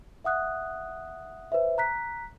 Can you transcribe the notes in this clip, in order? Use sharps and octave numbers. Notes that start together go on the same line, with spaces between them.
E5 F#5 D#6 F#6
B4 C5 E5
A#5 F#6 B6